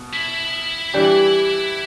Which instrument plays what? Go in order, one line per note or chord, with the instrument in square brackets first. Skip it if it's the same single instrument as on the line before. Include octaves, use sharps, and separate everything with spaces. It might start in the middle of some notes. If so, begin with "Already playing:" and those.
Already playing: [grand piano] B2
[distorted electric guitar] E4
[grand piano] E3 G3 D4 G4